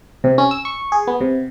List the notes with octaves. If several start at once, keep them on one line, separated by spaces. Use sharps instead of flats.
C3
C#4
E6
C#6
G#4
B3
C3